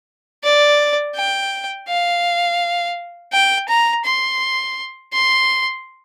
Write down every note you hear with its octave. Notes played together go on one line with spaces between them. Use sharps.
D5
G5
F5
G5
A#5
C6
C6